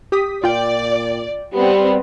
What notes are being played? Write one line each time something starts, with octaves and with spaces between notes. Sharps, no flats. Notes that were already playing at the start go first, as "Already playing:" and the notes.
G4 D#6 B6
A#2 F4 D5 G5
G3 B3 C4 G4